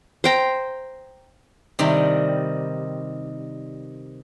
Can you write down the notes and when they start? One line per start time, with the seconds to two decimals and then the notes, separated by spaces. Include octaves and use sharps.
0.24 C5 G5 A#5
1.79 C3 D#3 G3